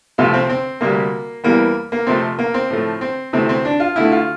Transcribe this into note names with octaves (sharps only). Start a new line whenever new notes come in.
C2 C3 F3 A3 F4
C4
C4
D2 C3 G3 A#3
E2 E3 G3 A#3
A#3
F2 C3 F3 A3 C4
A#3
C4
A2 F3 A3
C4
D2 C3 E3 A3 C4
C4
D4
F4
D2 D3 A3 E4
F4